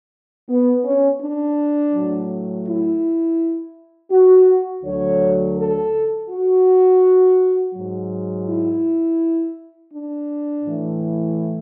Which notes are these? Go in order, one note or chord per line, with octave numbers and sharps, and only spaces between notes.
B3
C#4
D4
A2 F#3
E4
F#4
D2 D3 F#3 C#5
A4
F#4
G#2 F#3
E4
D4
A2 E3